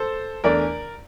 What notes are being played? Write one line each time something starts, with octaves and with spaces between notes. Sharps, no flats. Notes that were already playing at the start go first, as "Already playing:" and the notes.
Already playing: A4 C5
E2 E3 A3 D4 A#4 D5